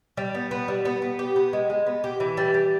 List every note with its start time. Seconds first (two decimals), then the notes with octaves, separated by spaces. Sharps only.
0.17 G3
0.35 B3
0.51 B3
0.68 G3
0.85 B3
1.02 B3
1.19 G4
1.36 B3
1.53 G#3
1.70 G#3
1.86 B3
2.04 G4
2.20 E3
2.37 G3
2.54 G3